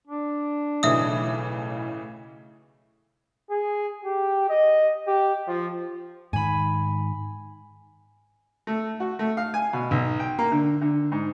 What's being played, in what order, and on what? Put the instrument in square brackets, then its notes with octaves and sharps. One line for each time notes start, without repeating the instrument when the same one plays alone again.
[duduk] D4
[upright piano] B1 [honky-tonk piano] A2 C#3 E3 [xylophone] E5 D#6
[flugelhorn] G#4
G4
D#5
G4
F3
[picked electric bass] G#2 D#3 [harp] G#5 B5
[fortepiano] A3
F#4
A3
F5
G#5
B2
B1
G5
A#3
D3
D3
G#2